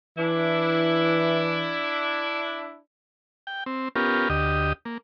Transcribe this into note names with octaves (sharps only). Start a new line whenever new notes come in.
E3 D4 E4
G5
C4
B3 C#4 F4 G4 A#4
D2 G4 D#5
A#3